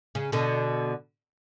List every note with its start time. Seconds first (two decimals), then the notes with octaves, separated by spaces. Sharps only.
0.15 C#3
0.32 B2 D3